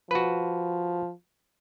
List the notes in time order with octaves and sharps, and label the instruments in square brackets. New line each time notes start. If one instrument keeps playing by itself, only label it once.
[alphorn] F3 [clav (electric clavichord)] F#4 B4